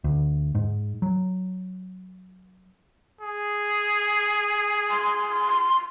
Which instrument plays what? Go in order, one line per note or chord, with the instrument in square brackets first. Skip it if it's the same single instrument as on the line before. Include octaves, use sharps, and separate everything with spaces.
[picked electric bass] D2
G#2
F#3
[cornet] G#4
[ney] C6